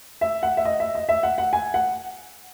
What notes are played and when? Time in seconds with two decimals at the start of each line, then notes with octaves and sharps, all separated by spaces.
0.21 E5
0.43 F#5
0.57 E5
0.65 D#5
0.80 E5
0.95 D#5
1.09 E5
1.23 F#5
1.38 F#5
1.53 G#5
1.74 F#5